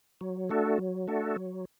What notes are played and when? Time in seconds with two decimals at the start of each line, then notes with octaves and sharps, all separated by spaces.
0.21 F#3
0.49 A3 D4 F#4 A4
0.78 F#3
1.07 A3 D4 F#4 A4
1.36 F#3